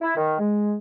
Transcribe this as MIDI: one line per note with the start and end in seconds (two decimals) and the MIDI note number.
0.02 0.13 64
0.17 0.39 51
0.40 0.76 56